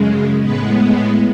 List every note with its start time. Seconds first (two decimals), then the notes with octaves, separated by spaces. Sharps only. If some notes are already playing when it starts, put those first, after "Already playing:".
Already playing: F#2 C#3 G#3
0.42 A2 G#3 B3 B4